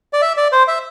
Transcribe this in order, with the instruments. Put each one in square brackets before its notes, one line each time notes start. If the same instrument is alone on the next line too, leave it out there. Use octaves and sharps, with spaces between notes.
[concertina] D5
E5
D5
C5
E5